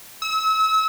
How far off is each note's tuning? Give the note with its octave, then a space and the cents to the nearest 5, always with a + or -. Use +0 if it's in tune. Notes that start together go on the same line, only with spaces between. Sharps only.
E6 -35